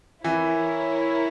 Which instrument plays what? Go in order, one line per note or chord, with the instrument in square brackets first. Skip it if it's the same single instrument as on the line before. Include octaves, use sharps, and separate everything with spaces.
[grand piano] E3 [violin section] E4 A#4 C#5